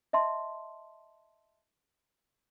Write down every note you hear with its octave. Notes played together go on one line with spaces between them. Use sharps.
D#5 E5 A5 C6